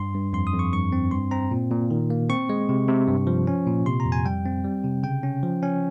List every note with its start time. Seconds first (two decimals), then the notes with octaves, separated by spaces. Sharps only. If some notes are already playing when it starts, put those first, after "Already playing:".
Already playing: G2 C6
0.14 G2
0.33 F2 C6
0.47 D#6
0.53 F2
0.59 C#6
0.72 G2 C#6
0.92 C4
1.11 G2 C6
1.31 C4 A#5
1.51 A#2
1.71 A#2
1.91 D#3
2.10 A#3
2.30 C4 C#6
2.49 G#3
2.69 C3
2.88 C3
3.08 G2
3.27 F3
3.47 C#4
3.67 A#2
3.86 C3 C6
4.00 A#5
4.05 F2
4.12 G#5
4.25 G3 G5
4.45 C4
4.64 G3
4.84 C3
5.03 C#3 G5
5.23 C#4
5.43 F3
5.63 C#4